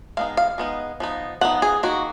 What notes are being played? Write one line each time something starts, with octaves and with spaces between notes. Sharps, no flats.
G#3 B3 D#4 F5
F5
G#3 B3 D#4
F3 B3 D#4
F3 B3 D#4 F#5
G#4
D#3 A#3 D#4 F#4